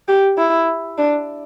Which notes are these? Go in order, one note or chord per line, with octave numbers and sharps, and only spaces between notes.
G4
E4
D4